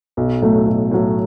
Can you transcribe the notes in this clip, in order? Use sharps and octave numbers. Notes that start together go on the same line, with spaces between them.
B1
A2 F#3 A3
B1
A2 F#3 A3